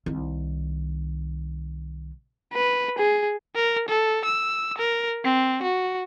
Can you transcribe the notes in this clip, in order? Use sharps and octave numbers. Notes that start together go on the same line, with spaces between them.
C2 D#3
B4
G#4
A#4
A4
E6
A#4
C4
F#4